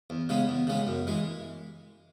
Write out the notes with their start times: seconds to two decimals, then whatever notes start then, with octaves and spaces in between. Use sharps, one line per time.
0.10 E2
0.29 C#3 G#3 B3
0.49 E2
0.67 C#3 G#3 B3
0.87 F#2
1.07 E3 G#3